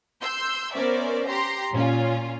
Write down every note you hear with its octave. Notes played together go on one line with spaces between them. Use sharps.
C6 E6 G6
B3 C#4 A#4 C5 D5 E5
G4 A#5 C6
A#2 C#4 F4